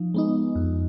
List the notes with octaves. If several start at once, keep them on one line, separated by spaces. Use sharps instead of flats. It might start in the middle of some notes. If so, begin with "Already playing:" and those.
Already playing: F3 D#4
G#3 B3 D#4
F2